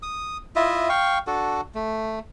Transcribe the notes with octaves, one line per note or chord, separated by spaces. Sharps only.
D#6
E4 F4 D#5 E5
F5 G5 C#6
D4 F#4 A4
A3